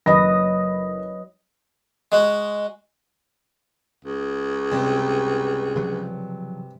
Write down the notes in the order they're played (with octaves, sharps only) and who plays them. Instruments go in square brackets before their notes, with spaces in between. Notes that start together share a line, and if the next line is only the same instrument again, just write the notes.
[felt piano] F#1 B5 A#6 [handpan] F#3 B4 D#5
[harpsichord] G#3 F#4
[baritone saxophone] C#2
[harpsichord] G2 C3
[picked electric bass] C#3 F3 F#3